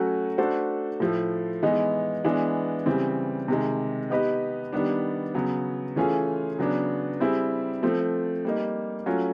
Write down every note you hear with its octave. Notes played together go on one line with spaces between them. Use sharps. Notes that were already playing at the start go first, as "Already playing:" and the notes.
Already playing: F#3 A3 C#4 F#4
A3 D4 F#4 A4 C5
A2 F3 A3
E3 G#3 B3 D#4
E3 G#3 B3 D4
C#3 E3 G3 C4
C3 D#3 G#3
B3 D#4 G4 B4 D#5
D#3 G3 B3 D4
C#3 F#3 B3
E3 A3 C#4 F4 G#4
C#3 F#3 B3 D4
G3 C4 E4 G#4
F3 A3 C4
G3 A#3 D#4
F#3 A3 C#4 F4